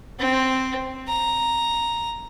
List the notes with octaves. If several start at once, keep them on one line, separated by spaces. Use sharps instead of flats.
C4
A#5